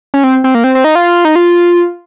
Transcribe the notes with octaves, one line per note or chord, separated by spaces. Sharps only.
C#4
C4
C4
A#3
C4
C4
D#4
F4
D#4
F4